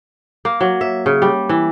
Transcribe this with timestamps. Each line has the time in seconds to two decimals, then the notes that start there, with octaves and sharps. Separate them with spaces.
0.45 A#3
0.61 F#3
0.81 E5
1.06 C#3
1.22 G3
1.49 E3